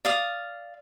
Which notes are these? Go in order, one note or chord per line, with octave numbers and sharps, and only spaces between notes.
D5 F5 D#6